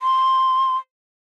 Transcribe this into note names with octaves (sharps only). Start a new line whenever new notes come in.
C6